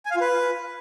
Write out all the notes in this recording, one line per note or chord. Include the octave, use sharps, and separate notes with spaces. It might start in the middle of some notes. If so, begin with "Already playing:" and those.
G#5
F5
F4
B4